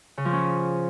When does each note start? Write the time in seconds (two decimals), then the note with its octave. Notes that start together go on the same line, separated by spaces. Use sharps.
0.17 C#3
0.25 F3
0.33 C#4